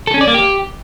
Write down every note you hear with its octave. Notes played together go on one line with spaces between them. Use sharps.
A4
C#4
D5
A#3
G4